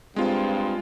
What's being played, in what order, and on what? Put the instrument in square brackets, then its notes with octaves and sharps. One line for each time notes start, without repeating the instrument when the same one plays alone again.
[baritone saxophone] G2 [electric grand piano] G#3 F4 [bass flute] C4